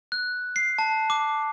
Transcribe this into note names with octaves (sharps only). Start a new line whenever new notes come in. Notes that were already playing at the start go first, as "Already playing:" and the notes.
F#6
C7
A5
D6